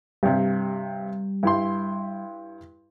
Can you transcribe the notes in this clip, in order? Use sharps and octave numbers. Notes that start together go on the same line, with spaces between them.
G2 C3 G3
G2 E4 C6